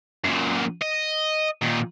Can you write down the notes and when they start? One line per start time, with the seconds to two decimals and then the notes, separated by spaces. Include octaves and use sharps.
0.24 F#2 A#2
0.81 D#5
1.63 A#2 D#3